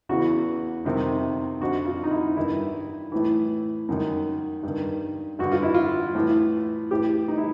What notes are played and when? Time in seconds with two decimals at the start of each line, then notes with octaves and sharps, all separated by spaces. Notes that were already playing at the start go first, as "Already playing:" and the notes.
0.09 E2 C#3 E3 F#4
0.85 F2 C3 D#3
1.61 F2 D3 F#4
1.86 F4
2.03 D#4
2.11 E4
2.37 G2 D#3 E4
3.12 A2 E3
3.89 F#2 D#3
4.63 G2 D#3
5.39 G2 D3 F#4
5.52 F4
5.63 E4
5.74 F4
6.15 A2 E3
6.91 A2 E3 G4
7.28 D#4
7.38 E4